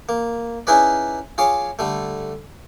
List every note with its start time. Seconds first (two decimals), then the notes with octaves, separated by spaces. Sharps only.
0.09 A#3
0.67 C#4 D#4 E4 G#4 B4 D5
1.38 F4 G#4 C#5 D6
1.79 D3 G3 A3